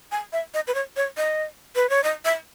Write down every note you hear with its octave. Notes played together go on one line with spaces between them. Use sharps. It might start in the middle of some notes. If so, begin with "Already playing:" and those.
G#5
E5
D#5
B4
C#5
C#5
D#5
B4
C#5
D#5
E5